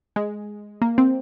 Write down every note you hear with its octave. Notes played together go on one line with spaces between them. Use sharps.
G#3
A#3
C4